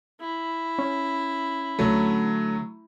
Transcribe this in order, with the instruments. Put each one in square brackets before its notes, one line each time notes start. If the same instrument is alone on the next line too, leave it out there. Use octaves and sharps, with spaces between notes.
[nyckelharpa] E4
[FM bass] C#4
[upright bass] D2 D3 [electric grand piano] F#3 A3